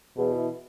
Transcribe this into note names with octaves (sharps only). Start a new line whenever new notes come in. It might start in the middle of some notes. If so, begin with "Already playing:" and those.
E2 B2
E3 B3 E4